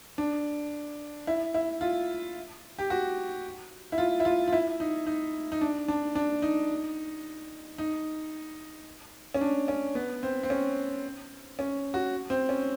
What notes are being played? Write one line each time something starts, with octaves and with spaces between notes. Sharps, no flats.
D4
E4
E4
F4
G4
F#4
E4
F4
E4
F4
F4
E4
D#4
D#4
D#4
D4
D4
D4
D#4
D#4
C#4
D4
C#4
B3
C4
C4
C#4
C#4
F#4
C4
C#4